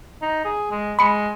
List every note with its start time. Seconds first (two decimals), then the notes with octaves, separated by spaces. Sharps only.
0.22 D#4
0.45 G#4
0.71 G#3
0.99 G#3 B5 C#7